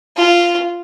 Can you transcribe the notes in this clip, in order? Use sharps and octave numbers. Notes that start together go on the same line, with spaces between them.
F4